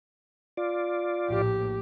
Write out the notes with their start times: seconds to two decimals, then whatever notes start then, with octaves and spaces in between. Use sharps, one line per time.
0.57 F4 D5
1.29 A#1 A2 G4